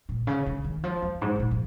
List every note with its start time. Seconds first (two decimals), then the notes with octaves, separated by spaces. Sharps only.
0.09 A#2
0.27 C#3
0.46 C#3
0.64 D#3
0.84 F3
1.02 F2
1.21 G#2
1.36 G#2
1.40 A#2
1.51 F3